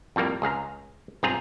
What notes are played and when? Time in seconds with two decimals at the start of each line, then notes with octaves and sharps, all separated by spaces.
0.16 F2 A2 G3 A#3
0.42 C#2 G#4 F5 A#5
1.23 B1 G2 C4 F4 G#4 A#5